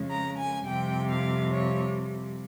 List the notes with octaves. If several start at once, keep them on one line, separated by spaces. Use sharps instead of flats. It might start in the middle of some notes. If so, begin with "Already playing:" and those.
Already playing: F2 C#3 G#3
A#5
G#5
F2 C3 G3 G5
F5
C#5